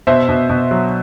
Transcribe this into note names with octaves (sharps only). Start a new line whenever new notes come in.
B2 C5 E5
B2
B2
F#3